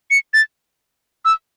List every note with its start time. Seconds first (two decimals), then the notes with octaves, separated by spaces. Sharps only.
0.11 C#7
0.34 A6
1.25 E6